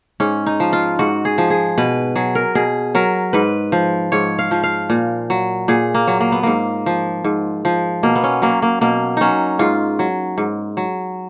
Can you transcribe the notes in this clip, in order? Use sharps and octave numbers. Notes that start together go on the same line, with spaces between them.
G#2 C#4
D#4
F3
F4
G#2 F#4
G#4
F3
G#4
B2 B4
F#3 G#4
A#4
B2 G#4
F#3 A#4
G#2 B4
F3
G#2 C#5
F5
F3
F5
A#2
F#3
A#2 G#4
A#3
F#3
A#3
B3
G#2 A#3
F3
G#2
F3
B2 A#3
B3
C#4
F#3 A#3
A#3
B2 A#3
F#3 C#4 D#4
G#2 F4
F#3
G#2
F#3